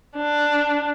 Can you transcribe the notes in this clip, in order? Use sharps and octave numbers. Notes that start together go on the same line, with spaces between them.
D4